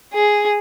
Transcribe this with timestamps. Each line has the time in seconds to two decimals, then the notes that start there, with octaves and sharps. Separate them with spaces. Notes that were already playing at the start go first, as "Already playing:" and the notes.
0.14 G#4